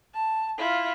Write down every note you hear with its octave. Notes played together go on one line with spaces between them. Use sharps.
A5
E4 F4